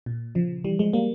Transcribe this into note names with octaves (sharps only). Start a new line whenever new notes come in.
A#2
C#3 F3
E3 G3
F3 G#3
G3 A#3